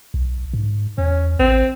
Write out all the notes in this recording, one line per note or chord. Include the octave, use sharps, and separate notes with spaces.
B1
G#2
E2 C#4
A1 C4